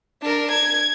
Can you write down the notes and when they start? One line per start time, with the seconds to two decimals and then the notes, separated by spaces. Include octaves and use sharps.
0.22 D4 A#4
0.51 G#6